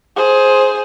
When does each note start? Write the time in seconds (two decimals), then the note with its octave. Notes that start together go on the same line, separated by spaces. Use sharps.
0.16 G#4 C5